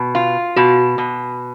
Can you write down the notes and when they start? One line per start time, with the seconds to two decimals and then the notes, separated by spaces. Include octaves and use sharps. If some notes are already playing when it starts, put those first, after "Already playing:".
Already playing: B2
0.15 F4
0.56 B2 F#4
0.98 B2